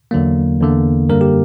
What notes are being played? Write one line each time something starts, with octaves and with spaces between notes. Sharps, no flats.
E2 D3 F#3 A#3
E2 D3 A#3
F#2 D3 G3 A#3 A#4
G4